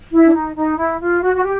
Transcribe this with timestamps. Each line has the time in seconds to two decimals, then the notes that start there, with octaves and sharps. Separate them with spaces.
0.11 E4
0.26 D4
0.33 D#4
0.56 D#4
0.77 E4
1.01 F4
1.23 F#4
1.35 F#4
1.45 G4